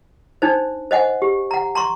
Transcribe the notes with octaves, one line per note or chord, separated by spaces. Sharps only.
D4 D#4 C5
C5 D#5 F#5 G#5
G4
F#5 A#5
A#5 C6 C#6